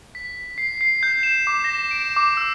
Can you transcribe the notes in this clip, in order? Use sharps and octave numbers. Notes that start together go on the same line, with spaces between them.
B6
C7
C7
G6
E7
D6
A#6
D7
D6
E6